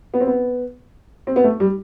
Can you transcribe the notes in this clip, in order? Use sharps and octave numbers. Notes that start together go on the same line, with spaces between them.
B3
C4
B3
C4
B3
A3
G3